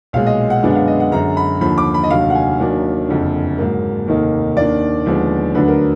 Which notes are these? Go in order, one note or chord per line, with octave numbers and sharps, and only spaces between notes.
B1 A#2 G#3 F5
D#5
F#5
F#2 D3 G#3 B3 D4
F#5
F5
D#5
F#5
F#2 D3 G#3 A#5
B5
D#2 D3 F3 B5
D6
B5
D#5
F1 D#2 D3 F#3 F5
F#5
G#5
D#2 D#3 F#3 A#3 D4
F#1 F2 D3
G#2 F#3 A#3
F1 D#2 D#3 A#3 D#4
D#2 D#3 A#3 D4 D5
D#2 D3 F3 G#3 B3
D2 D3 F#3 D4 B4
A#4